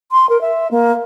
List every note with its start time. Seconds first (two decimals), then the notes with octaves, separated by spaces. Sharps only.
0.11 C6
0.29 A#4
0.41 E5
0.71 A#3